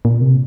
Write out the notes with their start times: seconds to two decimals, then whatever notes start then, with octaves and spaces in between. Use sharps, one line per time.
0.05 A#2
0.21 C3